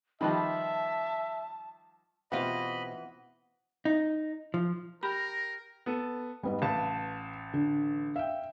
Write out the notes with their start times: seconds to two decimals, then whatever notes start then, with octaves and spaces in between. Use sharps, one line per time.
0.21 D#3 F3 G3 B4 D#5 E5 A5 B5
2.32 B2 E3 C4 F4 G4 D#5 F#5 B5
3.85 D#4
4.54 F3
5.03 G4 A#4 A#5 B5
5.86 B3 A4
6.43 G#2 G3 B3 D#5
6.62 A1 B4 F5 A5
7.54 D3 D4
8.16 E5 F5 G5